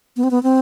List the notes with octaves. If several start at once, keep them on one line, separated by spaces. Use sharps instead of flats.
B3
C4
B3
C4